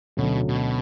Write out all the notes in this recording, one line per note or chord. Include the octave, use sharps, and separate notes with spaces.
D2 B2 D3 F#3 C#4
B2